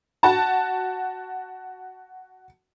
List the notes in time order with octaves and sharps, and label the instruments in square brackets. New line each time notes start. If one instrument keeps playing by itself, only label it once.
[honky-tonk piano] F#4 A5